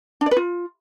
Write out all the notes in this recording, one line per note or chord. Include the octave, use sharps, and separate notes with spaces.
D4
D5
B4
F4